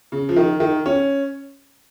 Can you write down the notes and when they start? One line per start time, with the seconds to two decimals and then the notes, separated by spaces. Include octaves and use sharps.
0.12 C#3
0.29 F3
0.36 D#3
0.60 D#3
0.86 C#4